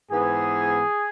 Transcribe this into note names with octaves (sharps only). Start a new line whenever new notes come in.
G#2 E3 B3 G#4